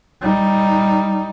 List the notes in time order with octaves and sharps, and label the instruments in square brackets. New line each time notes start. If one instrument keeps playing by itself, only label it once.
[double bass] G3 D#4